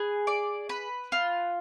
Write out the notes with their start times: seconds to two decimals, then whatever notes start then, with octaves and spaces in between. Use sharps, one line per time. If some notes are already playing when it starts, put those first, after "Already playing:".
Already playing: G#4 B4
0.27 D5
0.69 B4
1.12 F4